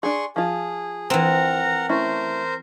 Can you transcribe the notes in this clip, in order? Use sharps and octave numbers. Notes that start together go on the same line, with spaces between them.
D4 G#4 C6 C#6
F3 F4 G#4
E3 C4 A#4 F#5 A#5
A3 C#4 E4 A#4 C5